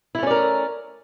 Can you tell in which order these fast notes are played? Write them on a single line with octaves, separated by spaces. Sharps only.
E4 A3 C#4 D5 A#4